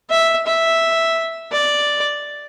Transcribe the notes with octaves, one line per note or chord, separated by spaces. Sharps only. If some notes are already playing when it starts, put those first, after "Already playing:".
E5
E5
D5